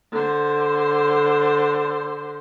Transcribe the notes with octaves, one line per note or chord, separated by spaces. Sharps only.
D3 C5